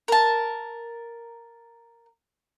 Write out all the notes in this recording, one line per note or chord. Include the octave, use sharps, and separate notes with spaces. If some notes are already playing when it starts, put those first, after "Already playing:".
A#4 A5